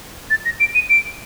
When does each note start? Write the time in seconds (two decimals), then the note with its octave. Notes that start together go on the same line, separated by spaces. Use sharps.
0.30 A6
0.45 A#6
0.60 D7
0.75 D#7
0.89 D7